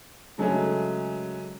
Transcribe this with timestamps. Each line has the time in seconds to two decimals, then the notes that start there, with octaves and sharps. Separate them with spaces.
0.38 C#3 F#3 G#3 A3 C#4